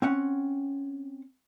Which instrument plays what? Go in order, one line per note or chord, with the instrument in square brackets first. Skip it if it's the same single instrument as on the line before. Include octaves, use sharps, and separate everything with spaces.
[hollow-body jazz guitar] C4 C#4 F#5